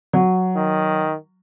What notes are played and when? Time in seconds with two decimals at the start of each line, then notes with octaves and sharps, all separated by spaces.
0.13 F#3
0.56 D#3